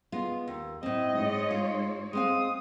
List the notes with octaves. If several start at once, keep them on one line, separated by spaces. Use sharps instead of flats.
G#3 B3 F4
D#2
A2 C4 D#5
G#2 G#3 C#5
F4
G#3 C4 F5 D#6